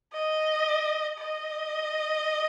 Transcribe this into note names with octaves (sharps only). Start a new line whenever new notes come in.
D#5
D#5